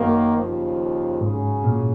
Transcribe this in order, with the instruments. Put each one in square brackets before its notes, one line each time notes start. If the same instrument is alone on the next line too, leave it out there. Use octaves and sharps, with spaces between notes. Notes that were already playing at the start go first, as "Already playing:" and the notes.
Already playing: [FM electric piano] F#2 [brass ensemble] D#3 F#3 A#3
[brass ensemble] D#2 C#3 F3
[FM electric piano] G#2 [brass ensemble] C#3 F#3 C#4 G#4
[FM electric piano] A#2